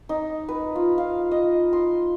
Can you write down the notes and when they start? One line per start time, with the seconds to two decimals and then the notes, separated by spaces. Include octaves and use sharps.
0.09 D#4
0.49 B4
0.75 F4
0.98 F5
1.31 D#5
1.73 C6